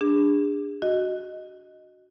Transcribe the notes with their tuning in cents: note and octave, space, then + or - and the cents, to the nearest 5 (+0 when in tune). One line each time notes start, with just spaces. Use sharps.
D4 +0 G#4 -35
F#4 +0 D#5 +0